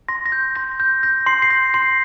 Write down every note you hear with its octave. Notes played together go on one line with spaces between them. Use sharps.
C6 A#6
A#6
G6
C6 A#6
G6
G6 A#6
C6 C7
C7
G6 A#6
C6 C7